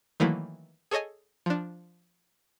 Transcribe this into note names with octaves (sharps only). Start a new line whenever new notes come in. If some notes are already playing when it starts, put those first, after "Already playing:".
D#3 E3 F#3 A3 A#3 E4
G#4 A4 C#5 D#5 G#5
F3 D4